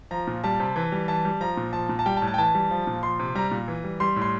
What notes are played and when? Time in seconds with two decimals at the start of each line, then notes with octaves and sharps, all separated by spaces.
0.11 F3 A#5
0.27 A#2
0.44 G3 A5
0.60 C3
0.76 E3
0.92 G3
1.08 E3 A5
1.25 G3
1.41 F3 A#5
1.57 A#2
1.73 F3 A5
1.89 A#2
1.99 A5
2.06 G3 G5
2.17 A5
2.22 A2
2.27 A5
2.34 G5
2.38 E3 A5
2.55 G3
2.71 F3
2.87 A#2
3.03 F3 C6
3.19 C3
3.35 G3 A#5
3.51 A#2
3.68 E3
3.84 G3
4.00 G3 C6
4.16 A2
4.22 C6